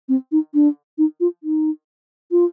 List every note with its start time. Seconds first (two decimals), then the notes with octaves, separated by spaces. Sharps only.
0.09 C4
0.32 D#4
0.54 D4
0.98 D#4
1.20 F4
1.43 D#4
2.31 F4